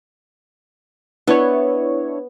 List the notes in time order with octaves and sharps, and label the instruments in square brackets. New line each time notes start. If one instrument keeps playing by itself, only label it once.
[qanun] B3 [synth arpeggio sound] D4 E4 C#5